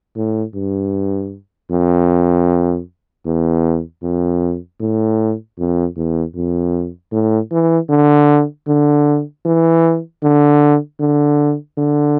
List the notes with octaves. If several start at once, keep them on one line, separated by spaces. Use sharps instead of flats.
A2
G2
F2
E2
F2
A2
F2
E2
F2
A2
E3
D3
D3
E3
D3
D3
D3